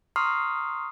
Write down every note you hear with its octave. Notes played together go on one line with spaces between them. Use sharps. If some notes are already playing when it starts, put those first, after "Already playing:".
A#5 C6 C#6 D#6 F6 C7